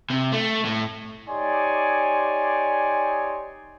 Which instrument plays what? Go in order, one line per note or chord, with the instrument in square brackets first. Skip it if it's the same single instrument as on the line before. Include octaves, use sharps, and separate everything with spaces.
[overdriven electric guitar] C3
A3
A2
[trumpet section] D#4 G4 C#5 D5 G#5 C6